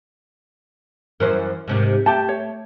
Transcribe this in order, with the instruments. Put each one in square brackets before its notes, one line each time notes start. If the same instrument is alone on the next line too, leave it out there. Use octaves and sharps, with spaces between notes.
[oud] F#2 E3 C5 [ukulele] A#4
[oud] G#2 C3 D#3
[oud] A3 [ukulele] G4 A5
[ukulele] C#5